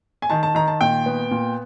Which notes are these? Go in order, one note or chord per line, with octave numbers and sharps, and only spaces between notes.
G#5
D#3 A5
A5
D#3 A#5
A5
A#2 G5
B3
A#2